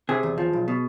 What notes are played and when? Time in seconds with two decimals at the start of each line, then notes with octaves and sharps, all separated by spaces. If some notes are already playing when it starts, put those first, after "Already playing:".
0.09 C3 G#4
0.23 E2
0.38 F3
0.53 B1
0.68 B2